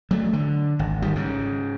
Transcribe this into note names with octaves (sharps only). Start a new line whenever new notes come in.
F#3 A3
D3
G#1
G#1 D#3 G3
G#2 C#3